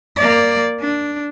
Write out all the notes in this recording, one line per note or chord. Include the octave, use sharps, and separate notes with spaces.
A#3 D5
D4